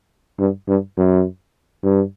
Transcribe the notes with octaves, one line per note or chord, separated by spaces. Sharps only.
G2
G2
F#2
G2